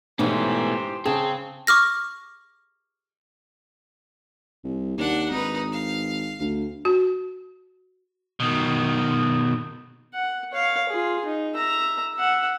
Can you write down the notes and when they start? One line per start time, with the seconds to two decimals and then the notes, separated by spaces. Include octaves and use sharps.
0.19 G#2 B2 E3 A3 C#4 G4 C5 A#5
1.06 C#3 C4 G#4 A5
1.67 C#6 D6 F6 A#6
4.64 C2
4.98 D#2 D4 F#5
5.31 G#1 D#4 B4
5.72 F5
6.40 D2
6.85 F#4
8.40 B2 D#3
10.14 F#5
10.53 C#5 F5
10.89 F4 G#4
11.25 D#4
11.55 E5 A#5
12.15 E5 F#5